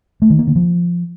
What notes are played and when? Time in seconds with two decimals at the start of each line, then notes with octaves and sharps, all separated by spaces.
0.22 A3
0.30 D#3
0.39 A#3
0.47 D3
0.56 F3